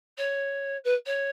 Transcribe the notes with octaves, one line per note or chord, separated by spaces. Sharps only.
C#5
B4
C#5